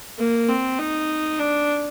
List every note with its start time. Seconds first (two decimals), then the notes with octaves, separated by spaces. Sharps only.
0.19 A#3
0.49 C4
0.79 D#4
1.39 D4